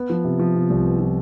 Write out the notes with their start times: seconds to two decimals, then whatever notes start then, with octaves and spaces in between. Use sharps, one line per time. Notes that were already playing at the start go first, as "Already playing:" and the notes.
Already playing: B3
0.10 F3
0.25 C3
0.39 F3
0.55 C3
0.70 C2
0.84 B3
0.99 F3